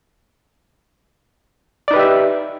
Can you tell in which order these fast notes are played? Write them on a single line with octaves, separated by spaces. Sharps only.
D5 D#4 B4 G4 E5